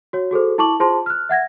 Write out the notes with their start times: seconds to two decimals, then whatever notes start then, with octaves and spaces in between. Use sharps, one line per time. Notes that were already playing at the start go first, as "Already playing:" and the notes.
0.13 F#4 C#5
0.31 F#4 G#4 A4 C5
0.58 E4 A5 C#6 D6 F#7
0.80 F4 G#4 C5 A5 C6
1.06 F6 F#6
1.29 E5 F#5 G#6 A#6